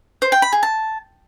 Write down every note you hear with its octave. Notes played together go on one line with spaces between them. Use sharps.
C5
G5
B5
G#4
A5